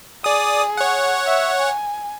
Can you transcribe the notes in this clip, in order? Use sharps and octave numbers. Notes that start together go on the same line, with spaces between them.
G#4 D5 D#6
C#5 F#5
E5
G#5